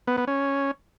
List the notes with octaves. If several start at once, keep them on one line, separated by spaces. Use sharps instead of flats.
B3
B3
C#4